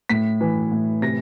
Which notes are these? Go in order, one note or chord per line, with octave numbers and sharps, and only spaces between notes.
A2 B6
E3
A2
C3 A#6